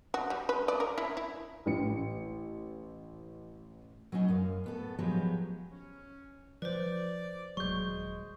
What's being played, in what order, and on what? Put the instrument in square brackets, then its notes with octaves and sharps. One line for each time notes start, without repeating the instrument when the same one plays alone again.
[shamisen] F#4
G3
B4
D5
A#4
E4
E4
[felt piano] A1 C#7
[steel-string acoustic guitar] F#3 B3 C#4 D#4
F#2 F5
A2 B3 A4
F3 F#3 G#3 B3 G4 G#4
[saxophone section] C#4
[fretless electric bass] F3 [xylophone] B4 C5 [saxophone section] D5
[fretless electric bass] D#1 F#3 [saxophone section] G#3 [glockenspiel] C#6 G6